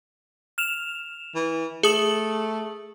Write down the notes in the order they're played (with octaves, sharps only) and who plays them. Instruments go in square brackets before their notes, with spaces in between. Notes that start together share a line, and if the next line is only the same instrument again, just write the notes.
[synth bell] F6 E7 F7
[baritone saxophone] E3
[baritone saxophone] A3 [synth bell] G#4 D#6 F#7